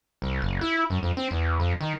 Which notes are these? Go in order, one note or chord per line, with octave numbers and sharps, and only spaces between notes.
C2
F#1
E4
F#2
F2
C4
E2
F2
D#3